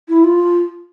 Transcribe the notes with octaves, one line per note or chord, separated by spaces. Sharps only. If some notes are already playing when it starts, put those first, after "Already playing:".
E4
F4